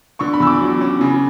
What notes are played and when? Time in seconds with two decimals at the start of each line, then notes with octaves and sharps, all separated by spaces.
0.19 D3 C#6
0.33 B5
0.40 E2 E6
0.47 D6
0.60 F#3
0.81 C#4
1.01 C#3